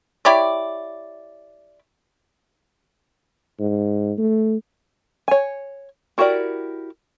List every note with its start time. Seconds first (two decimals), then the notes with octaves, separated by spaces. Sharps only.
0.25 E4 G4 C#5 D5
3.59 G#2
4.18 A3
5.28 C#5 G#5
6.18 E4 F#4 G4 A#4 D5